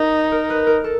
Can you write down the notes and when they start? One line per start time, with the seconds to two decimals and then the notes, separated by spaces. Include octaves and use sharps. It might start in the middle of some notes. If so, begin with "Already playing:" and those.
Already playing: D#4 A#4
0.32 A#4
0.50 B4
0.67 A#4
0.84 A4